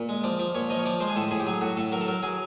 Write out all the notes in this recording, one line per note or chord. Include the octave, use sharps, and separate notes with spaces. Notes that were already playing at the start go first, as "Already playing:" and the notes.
Already playing: A#2
G#3
F3 D5
F3
A#2 C#5
F3 D#5
C#5
F3 D5
G#3 C5
G#4
A2 A4
A2 G#4
G4
F#3 G#4
A2 F#4
A2 A4
F#3 A#4
A4
F#3 A#4
F#3 G#4